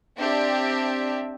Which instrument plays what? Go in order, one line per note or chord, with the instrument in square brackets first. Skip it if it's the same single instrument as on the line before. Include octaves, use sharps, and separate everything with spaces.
[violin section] C4 D4 G4 E5